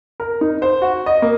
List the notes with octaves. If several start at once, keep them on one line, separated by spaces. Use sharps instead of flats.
A#4
D#4
C5
F#4
D#5
A#3